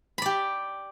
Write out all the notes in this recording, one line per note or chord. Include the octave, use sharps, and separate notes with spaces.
G4 D5 B5